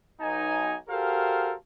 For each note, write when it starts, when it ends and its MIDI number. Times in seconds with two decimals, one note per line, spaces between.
0.21 0.76 35
0.21 0.76 63
0.21 0.76 80
0.89 1.54 66
0.89 1.54 67
0.89 1.54 69
0.89 1.54 70
0.89 1.54 72
0.89 1.54 77